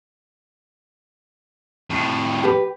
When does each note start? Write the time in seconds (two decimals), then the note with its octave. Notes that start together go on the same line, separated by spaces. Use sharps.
1.90 F2 A2
2.43 G4 B4